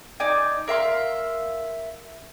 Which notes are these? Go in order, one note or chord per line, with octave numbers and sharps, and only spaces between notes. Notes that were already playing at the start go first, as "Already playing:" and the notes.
D#4 D5 G#5
A#4 E5 F5 C6